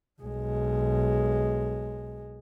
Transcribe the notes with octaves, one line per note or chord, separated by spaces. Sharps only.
B1 G#3